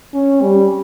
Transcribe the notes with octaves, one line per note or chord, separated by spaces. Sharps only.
C#4
G3